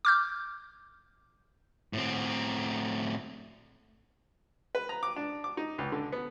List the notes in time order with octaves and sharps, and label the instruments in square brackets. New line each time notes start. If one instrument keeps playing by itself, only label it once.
[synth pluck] D6 F6 G6
[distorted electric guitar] A2 C4
[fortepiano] B4
A#5
D6
D4
D6
D#4
C#2
D3
B3